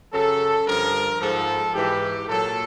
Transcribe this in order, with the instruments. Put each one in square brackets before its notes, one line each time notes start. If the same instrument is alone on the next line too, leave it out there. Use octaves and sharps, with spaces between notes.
[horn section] F#2 C#3 F#3 A4
G2 D3 F3 A#4
G#2 F3 A4
G#2 E3 G4
A#2 F#3 A4